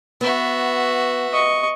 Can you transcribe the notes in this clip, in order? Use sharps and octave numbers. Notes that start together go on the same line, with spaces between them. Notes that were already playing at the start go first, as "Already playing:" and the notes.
B3 F#4 E5
D#5 C#6